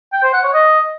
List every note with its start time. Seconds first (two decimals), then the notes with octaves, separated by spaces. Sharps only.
0.13 G5
0.23 C5
0.33 F#5
0.43 C#5
0.54 D#5